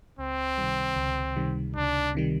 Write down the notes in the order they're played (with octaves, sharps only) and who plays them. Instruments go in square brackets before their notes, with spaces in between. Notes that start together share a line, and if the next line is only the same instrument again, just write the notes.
[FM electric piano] C#2 [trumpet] C4
[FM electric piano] C3 D#3 G3
C#2
C3 D#3 G3
[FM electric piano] C#2 [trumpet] D4
[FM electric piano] C3 D#3 G3